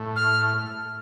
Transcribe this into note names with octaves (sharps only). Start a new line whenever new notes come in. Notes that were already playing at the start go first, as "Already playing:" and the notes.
Already playing: A2
F6